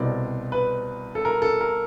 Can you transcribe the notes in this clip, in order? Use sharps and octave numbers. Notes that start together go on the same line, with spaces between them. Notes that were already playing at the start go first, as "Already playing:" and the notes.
Already playing: C2 B2 G3 C4 D5
B4
A4
A#4
A4
A#4